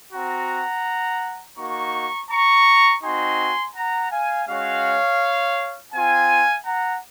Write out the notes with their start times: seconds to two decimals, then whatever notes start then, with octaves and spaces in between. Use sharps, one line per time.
0.12 C4 F#4 F#5 A#5
1.57 A#3 D#4 F#4 A#5 C#6
2.29 A#5 C#6
3.02 C4 D#4 F#4 G#5 C6
3.74 F#5 A#5
4.10 F5 G#5
4.47 G#3 C#4 F#4 C#5 F5
5.92 C4 F4 F5 G#5
6.64 F#5 A#5